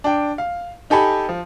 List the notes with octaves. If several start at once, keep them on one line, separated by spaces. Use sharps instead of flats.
D4 G5
F5
D#4 G4 A4 G#5 B5
F3